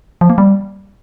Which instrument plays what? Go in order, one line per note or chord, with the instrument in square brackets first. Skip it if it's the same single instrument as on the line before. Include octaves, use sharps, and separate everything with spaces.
[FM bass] F3
A#3
G3